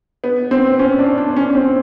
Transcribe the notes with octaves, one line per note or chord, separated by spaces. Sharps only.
B3
C4
C#4
D4
D4
C#4
C4